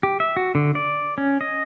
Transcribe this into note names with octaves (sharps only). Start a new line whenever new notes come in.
G4
E5
F#4
D3
D5
C#4
D#5